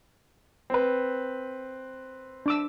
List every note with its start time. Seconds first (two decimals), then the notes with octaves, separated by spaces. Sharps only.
0.70 C4 B4
2.46 D4 D6 E6